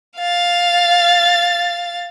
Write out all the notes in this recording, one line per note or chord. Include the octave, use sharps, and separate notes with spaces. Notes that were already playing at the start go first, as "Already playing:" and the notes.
F5 A6